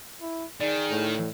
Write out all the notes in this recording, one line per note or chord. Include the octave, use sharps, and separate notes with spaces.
E4
D#3 G#4 D5
A2